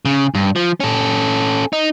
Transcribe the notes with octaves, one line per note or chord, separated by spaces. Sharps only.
C#3
G2
F3
C#4 A4
D#4